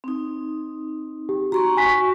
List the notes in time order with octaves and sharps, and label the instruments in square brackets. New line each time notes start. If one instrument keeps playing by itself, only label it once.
[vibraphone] C4 D#4
[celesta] G4
[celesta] F#4 [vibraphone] A#5 C6 C#6
[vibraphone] F#4 [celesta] G#5 C#6 B6